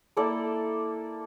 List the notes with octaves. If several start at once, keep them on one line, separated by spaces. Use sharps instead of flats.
A#3 E4 A4 D5